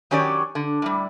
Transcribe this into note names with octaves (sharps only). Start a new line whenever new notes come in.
D#3 F#3 C#4 G4 C#5 D5
D3
A2 G3